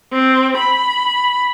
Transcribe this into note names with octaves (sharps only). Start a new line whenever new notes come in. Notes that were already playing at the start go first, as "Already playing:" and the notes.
C4
B5